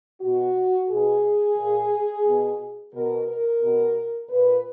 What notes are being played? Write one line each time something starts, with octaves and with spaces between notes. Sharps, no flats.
B2 F#4
B2 G#4
A#2
B2
B2 A#4
A#4
B2
A#2 B4